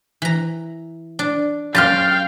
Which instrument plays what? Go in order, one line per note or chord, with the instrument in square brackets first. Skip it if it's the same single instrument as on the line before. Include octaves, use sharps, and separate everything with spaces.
[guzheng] E3 A#5
D4
[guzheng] F#2 G4 C6 [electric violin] F5 G5 [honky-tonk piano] F6 A6